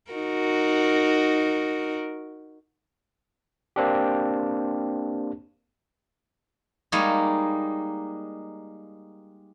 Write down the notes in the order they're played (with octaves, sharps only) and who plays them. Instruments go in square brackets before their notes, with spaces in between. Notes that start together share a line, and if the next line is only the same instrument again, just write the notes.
[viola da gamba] D#4 F#4 A#4
[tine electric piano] A#3 C4 D4 G4
[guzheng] G3 G#3 A#3 D#4 C#5